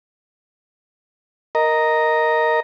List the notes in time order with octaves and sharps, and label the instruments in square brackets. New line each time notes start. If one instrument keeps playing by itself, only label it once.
[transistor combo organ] A#4 D#5 A#5